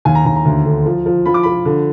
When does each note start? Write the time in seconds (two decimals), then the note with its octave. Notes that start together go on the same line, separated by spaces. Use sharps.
0.05 D#2 G#5
0.15 A#5
0.25 D#2 A#5
0.36 A#5
0.45 D2
0.65 D3
0.86 F3
1.06 F3
1.26 F3 B5
1.34 D6
1.43 F3 B5
1.65 D3